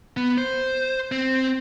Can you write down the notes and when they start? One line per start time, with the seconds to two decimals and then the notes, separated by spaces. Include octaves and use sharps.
0.17 B3
0.38 C5
1.12 C4